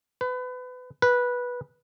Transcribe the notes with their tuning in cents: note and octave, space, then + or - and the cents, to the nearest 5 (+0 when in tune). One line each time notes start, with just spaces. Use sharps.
B4 +30
B4 -10